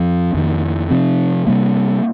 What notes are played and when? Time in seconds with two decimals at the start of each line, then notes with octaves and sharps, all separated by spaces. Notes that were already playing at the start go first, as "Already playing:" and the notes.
Already playing: F2 F3 C4
0.34 F2 D#3 A#3
0.90 C3 F3 C4
1.47 C3 G3 A#3